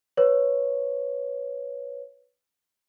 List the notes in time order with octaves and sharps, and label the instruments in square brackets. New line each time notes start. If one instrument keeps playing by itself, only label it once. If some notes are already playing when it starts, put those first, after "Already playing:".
[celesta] B4 C#5